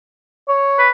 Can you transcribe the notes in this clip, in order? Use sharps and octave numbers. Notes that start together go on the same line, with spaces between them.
C#5
B4